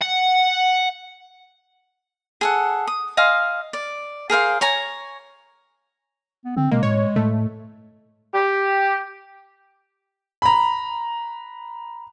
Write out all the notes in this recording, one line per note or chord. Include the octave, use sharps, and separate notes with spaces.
F#5
G#4 A4 F#5
D#6
D#5 F5 G#5 C6
D5
G#4 A#4 C5 F5
C#5 G#5 A#5
B3
D3 C4
B2 G#3 A#3
A2 C#5
A2 A3
G4
A#5 B5